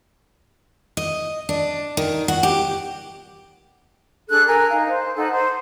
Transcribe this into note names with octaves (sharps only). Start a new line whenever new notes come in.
D#5
D4
D#3
F#4
G4
D4 G#4 A4 F#6
A#4 G#5
D#4 F5
C5
D#4 A4 F#5
C5